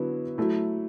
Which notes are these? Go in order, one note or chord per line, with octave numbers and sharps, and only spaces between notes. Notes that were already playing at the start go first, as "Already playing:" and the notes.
Already playing: D3 F#3 B3 E4
F#3 A3 E4